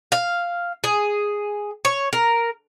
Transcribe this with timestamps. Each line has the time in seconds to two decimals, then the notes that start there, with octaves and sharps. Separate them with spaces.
0.12 F5
0.84 G#4
1.85 C#5
2.13 A#4